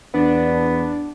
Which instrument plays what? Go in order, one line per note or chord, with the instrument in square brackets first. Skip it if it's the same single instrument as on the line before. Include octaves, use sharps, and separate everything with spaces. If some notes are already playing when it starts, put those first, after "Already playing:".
[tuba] E2 [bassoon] B3 [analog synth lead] D4